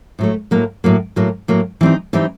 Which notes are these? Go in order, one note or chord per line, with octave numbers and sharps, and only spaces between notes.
A2 F#3 A3
A2 F#3 A#3
A2 F#3 A#3
A2 F#3 A#3
A2 F#3 A#3
E3 G3 C4 D#4
E3 G3 C4 D#4